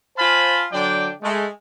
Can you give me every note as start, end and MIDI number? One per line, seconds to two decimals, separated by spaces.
0.17 0.65 65
0.17 0.65 72
0.17 0.65 77
0.17 0.65 80
0.17 0.65 81
0.17 0.65 83
0.72 1.10 50
0.72 1.10 54
0.72 1.10 62
0.72 1.10 74
0.72 1.10 79
1.23 1.47 56
1.23 1.47 57